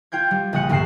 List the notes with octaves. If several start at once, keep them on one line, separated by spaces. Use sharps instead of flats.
F4 G5 G6 G#6
G3
A#1 C#3 D#6 F#6 C#7
D2 G2 C3 F#6 C7 E7